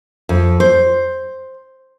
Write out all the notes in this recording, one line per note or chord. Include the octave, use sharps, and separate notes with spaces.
F2
C5